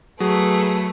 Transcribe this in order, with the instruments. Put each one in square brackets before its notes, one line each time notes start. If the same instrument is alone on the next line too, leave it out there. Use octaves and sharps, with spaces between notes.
[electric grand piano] F#3 [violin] A3 B4 [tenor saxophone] G#4